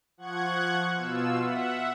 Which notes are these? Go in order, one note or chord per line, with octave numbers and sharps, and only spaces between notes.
F3 F#5 C#6 F#6 G#6
B2 F4 E6
E5 F#5